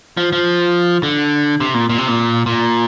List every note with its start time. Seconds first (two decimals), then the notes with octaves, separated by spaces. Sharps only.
0.17 F3
0.32 F3
1.03 D3
1.60 C3
1.74 A#2
1.89 A#2
1.98 C3
2.08 A#2
2.46 A#2